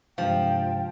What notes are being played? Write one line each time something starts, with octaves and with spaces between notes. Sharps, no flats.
G2 C3 F3 G#3 F5 G5